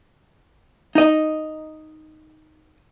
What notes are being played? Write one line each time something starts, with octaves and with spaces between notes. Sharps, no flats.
D#4 D#5